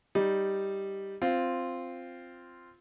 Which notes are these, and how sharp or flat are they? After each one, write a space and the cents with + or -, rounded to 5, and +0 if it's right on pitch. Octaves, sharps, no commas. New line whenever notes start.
G3 +0 D#4 +0
C4 +0 F4 +0